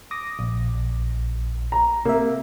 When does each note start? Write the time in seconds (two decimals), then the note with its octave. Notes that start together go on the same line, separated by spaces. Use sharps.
0.11 D6 D#6 A#6
0.39 A#1
1.72 A#5
2.05 C3 A#3 E5